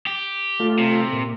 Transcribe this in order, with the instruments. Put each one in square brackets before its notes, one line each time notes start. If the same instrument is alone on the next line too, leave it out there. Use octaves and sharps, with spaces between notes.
[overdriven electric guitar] G4
[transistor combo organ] A3 F4
[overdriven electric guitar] C3
[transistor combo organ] A#2